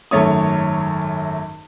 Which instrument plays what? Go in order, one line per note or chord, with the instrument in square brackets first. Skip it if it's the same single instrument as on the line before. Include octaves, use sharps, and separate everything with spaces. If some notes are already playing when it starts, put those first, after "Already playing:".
[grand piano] G#1 F#2 A3 C#5 D#6